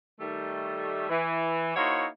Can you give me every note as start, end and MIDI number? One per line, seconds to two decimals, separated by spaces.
0.20 1.09 51
0.20 1.09 55
0.20 1.09 57
1.09 1.73 52
1.76 2.05 58
1.76 2.05 63
1.76 2.05 64
1.76 2.05 66
1.76 2.05 72
1.76 2.05 73